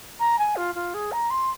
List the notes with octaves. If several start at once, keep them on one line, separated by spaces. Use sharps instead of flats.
A#5
G#5
F4
F4
G#4
A#5
C6